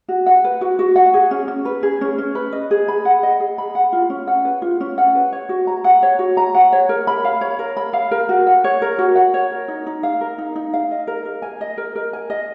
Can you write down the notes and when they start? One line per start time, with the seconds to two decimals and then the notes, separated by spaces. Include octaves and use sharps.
0.09 F#4
0.26 F#5
0.44 B4
0.61 F#4
0.79 F#4
0.96 F#5
1.14 G#4
1.31 C#4
1.48 C#4
1.65 B4
1.83 G#4
2.01 C#4
2.18 C#4
2.35 B4
2.53 D#5
2.71 G#4
2.88 B5
3.05 F#5
3.23 D#5
3.40 G#4
3.58 B5
3.75 F#5
3.93 F4
4.10 C#4
4.27 F#5
4.45 B4
4.62 F4
4.80 C#4
4.98 F#5
5.15 B4
5.33 C#5
5.49 F#4
5.67 A#5
5.84 F#5
6.03 C#5
6.19 F#4
6.37 A#5
6.55 F#5
6.72 C#5
6.89 A#4
7.07 B5
7.25 F5
7.41 C#5
7.59 A#4
7.77 B5
7.93 F5
8.11 A#4
8.29 F#4
8.47 F#5
8.64 C#5
8.82 A#4
8.99 F#4
9.15 F#5
9.34 C#5
9.52 A#4
9.68 D#4
9.86 D#4
10.03 F5
10.21 A#4
10.38 D#4
10.56 D#4
10.74 F5
10.91 D#5
11.07 A#4
11.25 A#4
11.42 G#5
11.61 D#5
11.78 A#4
11.96 A#4
12.13 G#5
12.30 D#5